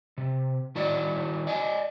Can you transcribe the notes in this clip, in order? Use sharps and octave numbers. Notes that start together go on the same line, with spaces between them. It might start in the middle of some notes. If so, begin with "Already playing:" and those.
C3
D#3 E4 F#4 D5
D5 D#5 G#5